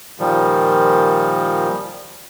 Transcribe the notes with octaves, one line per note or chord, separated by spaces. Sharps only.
A#2 D#3 F3 G3